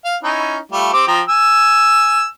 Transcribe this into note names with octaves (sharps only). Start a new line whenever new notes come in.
F5
C#4 D#4 E4
G3 A3 F4
C4 G4 D6
F3 G5 A#5
G#5 E6